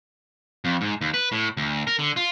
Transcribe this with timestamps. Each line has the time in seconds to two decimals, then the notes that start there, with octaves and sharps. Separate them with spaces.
0.65 F2
0.81 G#2
1.01 D#2
1.14 B4
1.32 A2
1.57 D2
1.87 A#4
1.99 D3
2.16 F4